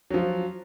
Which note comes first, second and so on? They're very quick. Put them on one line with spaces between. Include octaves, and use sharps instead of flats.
F#3 F3 F4